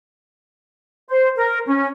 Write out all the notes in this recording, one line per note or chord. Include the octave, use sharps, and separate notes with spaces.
C5
A#4
C#4